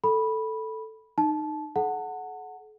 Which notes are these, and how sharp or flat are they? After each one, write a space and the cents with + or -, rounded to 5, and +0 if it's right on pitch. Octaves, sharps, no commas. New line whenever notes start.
A4 +0 B5 -10
D#4 -20 A5 -20
A4 -45 F#5 -5 A5 +40